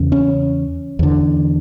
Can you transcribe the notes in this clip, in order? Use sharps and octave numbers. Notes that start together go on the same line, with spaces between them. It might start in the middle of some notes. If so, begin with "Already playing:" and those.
Already playing: E2 C#3
C#4
E2 D3